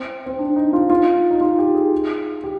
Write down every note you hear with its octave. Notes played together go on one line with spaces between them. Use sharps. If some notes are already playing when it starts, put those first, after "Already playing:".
Already playing: C4
C4
D4
D#4
F4
F4
D#4
F4
G4
G#4
G4